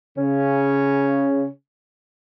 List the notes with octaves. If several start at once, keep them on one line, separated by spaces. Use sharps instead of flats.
C#3 C#4